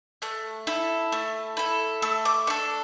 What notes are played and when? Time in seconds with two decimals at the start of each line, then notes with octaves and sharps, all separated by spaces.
0.22 A3 F#6
0.67 E4 A4
1.12 A3
1.57 E4 A4
2.02 A3 E6
2.25 D6
2.47 D4 A4 C#6